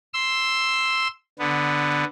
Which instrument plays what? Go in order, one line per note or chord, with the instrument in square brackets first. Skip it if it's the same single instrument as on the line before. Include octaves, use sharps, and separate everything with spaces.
[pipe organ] C6 E6
D3 B3